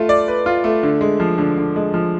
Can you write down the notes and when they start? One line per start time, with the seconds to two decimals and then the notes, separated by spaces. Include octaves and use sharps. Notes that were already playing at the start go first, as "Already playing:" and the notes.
Already playing: A3 F4
0.09 D5
0.28 B4
0.46 F4
0.64 A3
0.83 D3
1.01 G#3
1.20 F3
1.38 D3
1.57 D3
1.76 G#3
1.94 F3